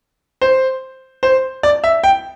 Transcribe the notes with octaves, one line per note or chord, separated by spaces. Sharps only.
C5
C5
D5
E5
G5